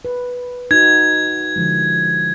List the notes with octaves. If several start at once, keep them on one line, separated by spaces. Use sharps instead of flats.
B4
D#4 F#4 G#6
D3 F3 G#3